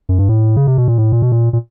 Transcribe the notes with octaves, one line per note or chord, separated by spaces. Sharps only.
F#2
G2
A2
C#3
C3
B2
A#2
A2
A#2
B2
A#2
A#2